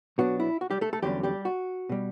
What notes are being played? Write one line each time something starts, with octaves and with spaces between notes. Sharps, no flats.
B2 F#3 B3 D4 F#4
E4
F#4
G3 G4
A3 A4
A3 A4
E2 D3 F#3 G3 C#4 G4
G3 G4
F#4
B2 G3